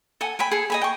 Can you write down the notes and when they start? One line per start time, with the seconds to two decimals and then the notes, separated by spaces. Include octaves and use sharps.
0.21 A4 F#5 G#5
0.39 G5 G#5 B5
0.51 G#4 A4
0.70 D#5 G#5 B5
0.81 G5 C#6